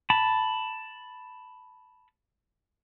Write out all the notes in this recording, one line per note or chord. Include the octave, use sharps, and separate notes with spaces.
A5 B5